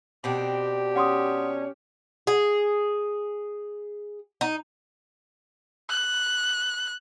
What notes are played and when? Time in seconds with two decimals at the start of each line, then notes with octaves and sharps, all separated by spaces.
0.24 B2 C4 D4 G4
0.96 C#4 F#5 C6 D#6
2.27 G#4
4.41 D#4
5.90 F#6